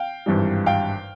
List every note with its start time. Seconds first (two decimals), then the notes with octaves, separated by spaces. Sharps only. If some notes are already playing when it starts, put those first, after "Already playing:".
Already playing: F5 G5
0.26 G#1 G2 E3 G3
0.66 F5 G5